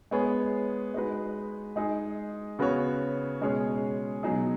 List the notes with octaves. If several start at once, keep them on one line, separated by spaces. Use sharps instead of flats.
G#3 B3 G#4 C#5
G#3 D#4 F#4 B4
G#3 D#4 G#4
C#3 B3 F#4 C#5
B2 G#3 C#4 G#4 C#5
B2 F#3 D#4 G#4